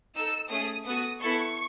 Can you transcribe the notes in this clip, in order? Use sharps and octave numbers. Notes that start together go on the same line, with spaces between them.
D#4 A4 E6
A3 C#4 G#4 D#6
B3 F#4 A4 D#6
B3 E4 A4 C#6